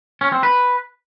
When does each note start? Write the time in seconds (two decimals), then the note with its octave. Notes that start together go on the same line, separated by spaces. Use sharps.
0.21 C#4
0.32 C4
0.43 B4